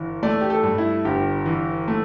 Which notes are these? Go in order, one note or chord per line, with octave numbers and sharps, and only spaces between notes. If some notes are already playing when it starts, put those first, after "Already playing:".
Already playing: G1 E3
A3 D5
G4
A4
G2
E4
G1 G4
E3
A3